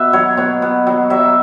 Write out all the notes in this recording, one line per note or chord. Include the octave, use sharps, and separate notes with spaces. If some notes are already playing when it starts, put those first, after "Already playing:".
Already playing: B2 E5
F#3 C#5
B2 C#5
B2
F#3
F#3 E5